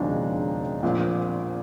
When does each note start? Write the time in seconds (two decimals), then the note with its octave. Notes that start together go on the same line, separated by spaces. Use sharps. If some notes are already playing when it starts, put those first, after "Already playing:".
Already playing: E1 D#2 C#3 F3 D4 D#4
0.83 A#1 A#2 F3